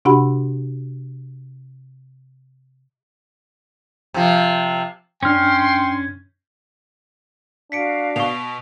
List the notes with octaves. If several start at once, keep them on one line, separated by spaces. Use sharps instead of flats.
C3 D4 F#4 G4 F#5 B5
C3 F3
F#2 C#4 D4 G5 C6 F6
D4 F#4 F5 B6 C#7 D7
B2 C#6 F7